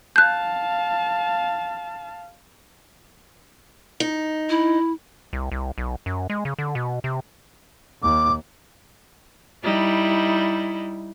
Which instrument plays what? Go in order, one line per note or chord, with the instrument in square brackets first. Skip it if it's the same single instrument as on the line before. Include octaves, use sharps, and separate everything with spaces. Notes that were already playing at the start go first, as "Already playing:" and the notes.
[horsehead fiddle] F5 A5 [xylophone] F#6 G6
[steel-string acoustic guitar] D#4
[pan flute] E4
[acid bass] C2
C2
B1
F#2
G#3
C#3
D3
B2
C3
[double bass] D#2 [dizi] D6
[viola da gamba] G3 D#4 E4